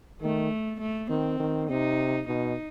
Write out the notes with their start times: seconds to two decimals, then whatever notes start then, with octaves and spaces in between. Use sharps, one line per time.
0.22 D#3 A3
0.80 A3
1.10 D#3 C4
1.40 D#3
1.69 C3 D#4
2.28 B2 D#4